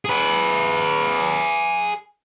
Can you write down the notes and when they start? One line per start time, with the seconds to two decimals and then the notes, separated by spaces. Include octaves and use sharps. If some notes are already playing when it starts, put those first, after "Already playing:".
0.05 G#4 B4